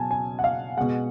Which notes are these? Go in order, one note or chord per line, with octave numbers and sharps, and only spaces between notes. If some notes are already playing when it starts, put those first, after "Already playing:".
Already playing: B2 F#3 G#5 A5
G#5
F#5
F5
B2 G#3 F#5